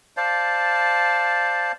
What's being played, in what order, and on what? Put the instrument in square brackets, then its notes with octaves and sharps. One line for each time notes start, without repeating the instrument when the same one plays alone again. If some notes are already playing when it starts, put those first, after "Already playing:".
[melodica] C5 D5 F5 A5